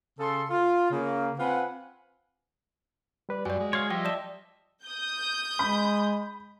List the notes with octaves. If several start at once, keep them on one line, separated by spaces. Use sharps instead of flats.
C#3 A4 C6
F4
C#3 A#3
C4 F4 B4 F#5 G#5 B5
G3 B4 D5
F#2 G3 F#4 D5 G#5
G#3
C#5 F5 C6
F3 G3 D#5 E5 G5
D5 A5 E7
D#6 G6
G#3 B5